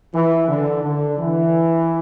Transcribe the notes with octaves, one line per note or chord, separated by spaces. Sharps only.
E3
D3
D3
E3